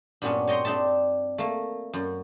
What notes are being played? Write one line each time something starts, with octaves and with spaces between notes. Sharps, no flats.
G2 A#2 F#3 B3 C#4 D4
C#5 D#5 G5 A#5 C6
C4 D4 D#4 E5 A5
A3 A#3
F#2